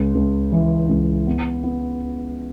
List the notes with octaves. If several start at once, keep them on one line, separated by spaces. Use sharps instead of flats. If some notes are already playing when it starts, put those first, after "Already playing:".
Already playing: C#2
C#2
E3
C#2
B3
B3